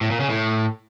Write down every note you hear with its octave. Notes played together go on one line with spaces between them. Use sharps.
A2
A#2
C#3
A2